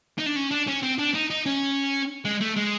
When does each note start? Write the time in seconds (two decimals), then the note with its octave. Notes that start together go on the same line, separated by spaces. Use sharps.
0.18 D#4
0.26 D4
0.36 C#4
0.51 D4
0.68 C#4
0.82 C4
0.99 D4
1.14 D#4
1.30 D#4
1.46 C#4
2.25 G#3
2.41 A3
2.57 G#3